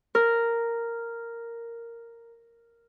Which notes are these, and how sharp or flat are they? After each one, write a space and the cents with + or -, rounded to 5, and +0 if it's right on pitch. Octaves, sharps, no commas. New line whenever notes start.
A#4 -5